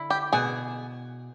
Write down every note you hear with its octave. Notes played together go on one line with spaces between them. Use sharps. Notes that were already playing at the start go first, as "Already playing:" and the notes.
Already playing: D3 E4
G4
B2 G#4